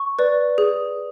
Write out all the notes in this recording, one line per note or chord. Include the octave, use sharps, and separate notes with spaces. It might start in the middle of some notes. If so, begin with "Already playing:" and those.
Already playing: C#6
B4 D5
G#4